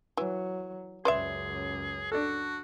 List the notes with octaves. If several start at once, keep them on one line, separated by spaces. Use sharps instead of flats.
E3 F#3
C#2 F#2 G#4 B4 D5 E5 C6
D4 F#4 A4